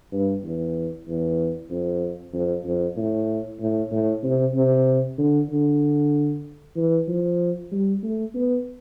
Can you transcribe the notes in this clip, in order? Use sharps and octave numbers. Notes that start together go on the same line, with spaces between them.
G2
E2
E2
F2
F2
F2
A2
A2
A2
C3
C3
D3
D3
E3
F3
G3
A3
B3